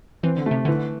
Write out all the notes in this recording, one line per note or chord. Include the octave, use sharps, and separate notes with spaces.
E3 C4
D3
C3 A3
D3 E3